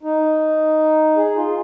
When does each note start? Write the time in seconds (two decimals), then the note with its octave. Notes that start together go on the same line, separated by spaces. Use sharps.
0.03 D#4
1.17 G#4
1.36 F4